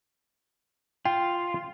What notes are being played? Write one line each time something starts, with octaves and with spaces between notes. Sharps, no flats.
F4 G5